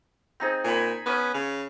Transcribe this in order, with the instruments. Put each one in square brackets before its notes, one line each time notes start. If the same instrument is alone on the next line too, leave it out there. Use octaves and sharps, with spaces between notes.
[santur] C4 D#4 G#4
[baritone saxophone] A#2 [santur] G#5 B5
[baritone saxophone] B3 [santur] C#4 D#6 E6
[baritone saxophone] C#3